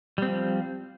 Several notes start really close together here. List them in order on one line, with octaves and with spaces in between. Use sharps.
G3 C4 F3